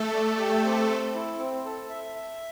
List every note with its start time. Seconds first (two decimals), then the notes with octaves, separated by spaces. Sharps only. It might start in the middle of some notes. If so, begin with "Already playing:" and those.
Already playing: A3 A4
0.14 D5
0.39 G4
0.65 C4
0.89 C4
1.14 E4
1.39 C4
1.65 A4
1.90 E5
2.15 E5